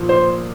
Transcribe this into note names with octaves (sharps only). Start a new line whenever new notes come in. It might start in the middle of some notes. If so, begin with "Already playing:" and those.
Already playing: A#2 F3 A#3
C5